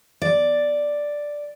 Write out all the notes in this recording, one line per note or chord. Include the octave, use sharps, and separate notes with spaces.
D5